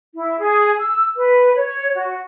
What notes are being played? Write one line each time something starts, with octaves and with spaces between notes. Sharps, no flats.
E4
G#4
E6
B4
C#5
F#4